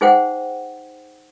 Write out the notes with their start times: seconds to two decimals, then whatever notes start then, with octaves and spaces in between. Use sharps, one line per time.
0.01 D#4 G#4 C5 F#5 G5